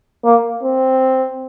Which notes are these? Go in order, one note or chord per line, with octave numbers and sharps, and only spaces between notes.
A#3
C4